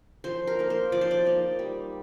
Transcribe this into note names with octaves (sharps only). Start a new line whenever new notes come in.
F3 C5
A#4
A#3 D#4
C5
F3 D5
C5
D5
A#3 D#4
G3